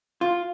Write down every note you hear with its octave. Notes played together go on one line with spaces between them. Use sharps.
F4